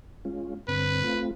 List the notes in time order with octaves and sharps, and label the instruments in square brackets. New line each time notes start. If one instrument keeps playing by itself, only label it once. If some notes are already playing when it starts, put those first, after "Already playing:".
[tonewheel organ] G#3 C#4 F4
[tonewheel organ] G2 D3 C4 [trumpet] B4
[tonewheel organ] A3 C4 F4